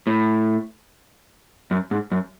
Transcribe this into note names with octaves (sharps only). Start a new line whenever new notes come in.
A2
F#2
G#2
F#2